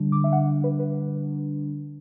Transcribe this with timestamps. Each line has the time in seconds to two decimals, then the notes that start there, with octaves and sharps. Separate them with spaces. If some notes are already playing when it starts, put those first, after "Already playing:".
Already playing: D3 G3 D4
0.12 D6
0.24 E5
0.33 F#5
0.64 B4
0.79 B4